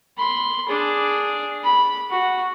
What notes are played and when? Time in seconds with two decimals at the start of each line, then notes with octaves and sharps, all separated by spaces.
0.18 B5 C6
0.69 D4 G#4
1.64 B5
2.10 F#4